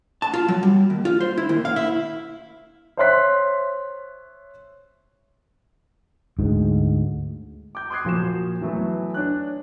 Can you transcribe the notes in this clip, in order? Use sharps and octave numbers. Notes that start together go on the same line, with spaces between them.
A5
F4
F#3
G3
D#2
F4
C5
E4
D#2
F5
E4
C5 C#5 E5 C6 F#6 B6
D2 G#2
D6 G6
C6 D6 D#6 F#6 G#6 C7
A#2 F3 F#4 E7
E3 F#3 A3 B3
D4 C#5 F#6